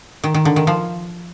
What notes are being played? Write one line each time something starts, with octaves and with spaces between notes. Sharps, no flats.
D#3
D#3
D3
D#3
F3